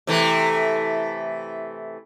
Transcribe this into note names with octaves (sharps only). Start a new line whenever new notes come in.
C3 E3 A3